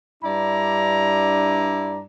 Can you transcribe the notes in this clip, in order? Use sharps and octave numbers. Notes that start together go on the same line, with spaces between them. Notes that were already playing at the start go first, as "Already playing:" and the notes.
G2 D4 E4 D5 A#5